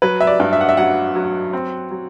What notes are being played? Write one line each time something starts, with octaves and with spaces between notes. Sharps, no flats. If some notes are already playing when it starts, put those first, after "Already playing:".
F#3 B4
E5
D5
G2
E5
F#5
E5
F#3 F#5
F#3
C4
F#3